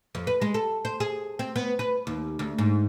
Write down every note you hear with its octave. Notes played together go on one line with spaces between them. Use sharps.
F2
B4
G#3
A4
C5
G#4
C4
B3
B4
D#2
D2
G#2